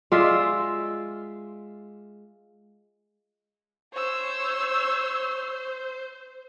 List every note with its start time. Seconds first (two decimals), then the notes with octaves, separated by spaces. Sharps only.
0.12 G#3 F4 D5 E5
3.93 C5 C#5 E6